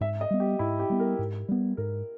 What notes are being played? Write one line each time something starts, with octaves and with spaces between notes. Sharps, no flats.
G#2 E5
D#5
G3 B3
G4
G#2 E4
G4
G3 B3
A#4
G#2
G3 B3
G#2 A#4